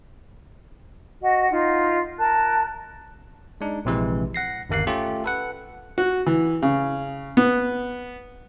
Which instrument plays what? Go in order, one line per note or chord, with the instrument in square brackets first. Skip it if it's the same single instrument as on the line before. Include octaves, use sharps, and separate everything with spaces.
[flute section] F#4 D#5 F#5
D#4 F4
A#4 A5 F#6
[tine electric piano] G#3 D4 D#4
A#1 C3 E3 G#3
F#5 A#6 C7
G1 D#2 A#3 F#6 C7
A3 C#4 F4 G4
A4 B4 F#5
[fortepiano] F#4
E3
C#3
B3